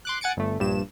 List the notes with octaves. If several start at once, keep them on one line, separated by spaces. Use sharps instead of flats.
C6 D6 F#6
F#5 G#5 A6 C#7 D7
G1 A3
A#1 G2 E7